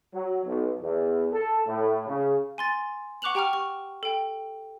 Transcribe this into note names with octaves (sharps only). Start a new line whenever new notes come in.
F#3
B1
E2
A4
A2
C#3
G#5 C6 A6
F#5 C#6 D6 F#6 F7 F#7
G4 G5 A#5 C#6 F6
C#6
A4 G5